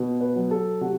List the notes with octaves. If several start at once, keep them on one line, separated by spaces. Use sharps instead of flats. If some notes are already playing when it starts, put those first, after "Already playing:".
Already playing: B2
B4
F#3
A4
C3 F#4